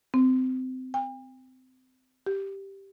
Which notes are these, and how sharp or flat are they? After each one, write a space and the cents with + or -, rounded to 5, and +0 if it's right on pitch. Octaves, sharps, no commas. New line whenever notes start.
C4 -25
G5 +45
G4 +0